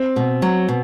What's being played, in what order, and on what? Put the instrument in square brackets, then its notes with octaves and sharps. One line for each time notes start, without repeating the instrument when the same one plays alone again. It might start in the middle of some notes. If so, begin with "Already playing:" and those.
Already playing: [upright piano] C4
[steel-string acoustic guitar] B2
F#3
B2